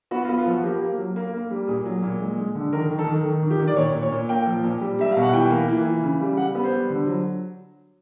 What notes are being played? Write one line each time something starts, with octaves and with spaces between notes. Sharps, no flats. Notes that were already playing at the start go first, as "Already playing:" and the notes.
B3 F#4
F4
B3
F4
F3 F#4
A#3 G4
A#3
F#3
A#3
A#3
G3
A#2 G#4
F#3
A#2
G#3
G#3
D3
D#3 A#4
D#3
A4
D#3
D#3
D#3
G4
D#3
D5
A#2 C#5
A#2
C#5
A#2
A#3 G5
F3
A#2
G3
G3 E5
B2 F5
F#5
E3 G5
A#3
E3
E3
C#3
G3
G3 F#5
B3
C5
G3
D3
F#3